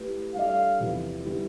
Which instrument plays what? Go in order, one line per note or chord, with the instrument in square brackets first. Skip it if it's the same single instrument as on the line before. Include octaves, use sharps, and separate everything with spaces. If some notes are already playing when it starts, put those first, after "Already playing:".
Already playing: [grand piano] A3 E4 G4 B4
[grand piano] G3 D4 A4 D5 [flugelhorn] F5
[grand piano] E2 C3 F3 B3 E4
D3 G3 B3 E4